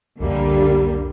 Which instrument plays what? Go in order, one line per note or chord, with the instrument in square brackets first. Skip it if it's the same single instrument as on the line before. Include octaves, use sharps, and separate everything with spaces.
[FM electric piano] C2 F2 [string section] D3 G3 A#3